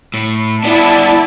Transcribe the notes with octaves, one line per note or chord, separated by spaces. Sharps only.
A2
B3 D4 E4 D5 A5